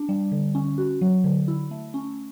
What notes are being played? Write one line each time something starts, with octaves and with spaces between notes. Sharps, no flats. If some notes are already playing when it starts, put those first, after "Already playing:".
Already playing: D4
G3
D3
C#4
F#4
F#3
D3
E4
A3
C#4